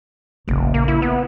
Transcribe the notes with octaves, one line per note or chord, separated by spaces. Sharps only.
F1 A#1 C#3
A#3
E4
B3